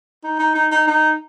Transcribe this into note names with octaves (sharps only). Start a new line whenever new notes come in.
D#4
D#4
D#4
D#4
D#4